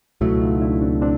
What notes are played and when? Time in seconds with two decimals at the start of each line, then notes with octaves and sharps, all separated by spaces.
0.21 C#2 B2 F#3 A3 E4 F#4
0.41 D#4 F4
0.61 D4 E4
0.82 C4 D4
1.01 C4 D4